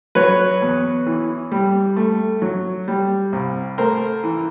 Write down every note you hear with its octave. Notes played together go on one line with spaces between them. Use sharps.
F#3 B4 C#5
E2
E3
G3
A3
F#3
G3
C2
A3 A#4 C5
E3